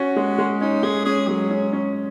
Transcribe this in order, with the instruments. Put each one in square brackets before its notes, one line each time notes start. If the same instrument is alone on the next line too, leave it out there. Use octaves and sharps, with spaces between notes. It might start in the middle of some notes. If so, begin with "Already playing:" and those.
Already playing: [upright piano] C#4 [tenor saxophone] F#4
[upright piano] G#3
G#3
[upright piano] C#4 [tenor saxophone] D#4
[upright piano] G#3 [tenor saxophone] G#4
[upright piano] C#4 [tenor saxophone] G#4
[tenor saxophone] F#3 [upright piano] G#3
[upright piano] C#4
C#4